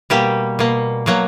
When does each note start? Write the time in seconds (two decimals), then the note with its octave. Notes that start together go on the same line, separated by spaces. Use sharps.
0.10 B2 G3 A#3 G4
0.59 B2 A#3
1.06 B2 F#3 A#3